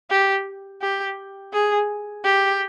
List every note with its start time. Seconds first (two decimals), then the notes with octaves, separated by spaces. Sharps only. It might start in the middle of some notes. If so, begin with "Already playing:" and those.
0.11 G4
0.82 G4
1.53 G#4
2.25 G4